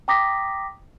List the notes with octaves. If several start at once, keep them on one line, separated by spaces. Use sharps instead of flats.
G5 A#5 D6 D#6 A#6 B6